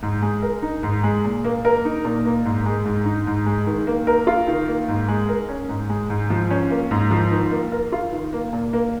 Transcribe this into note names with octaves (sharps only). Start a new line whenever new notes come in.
G#2
G#3
A#4
D#4
G#2
G#3
A#2
A#3
A#4
D#4
A#2
A#3
G#2
G#3
G#2
D#4
G#2
G#3
D#3
A#3
A#4
F4
D#3
A#3
G#2
G#3
A#4
C#4
G#2
G#3
G#2
F3
C#4
A#3
G#2
F3
D#3
A#3
A#4
F4
D#3
A#3
A#2
A#3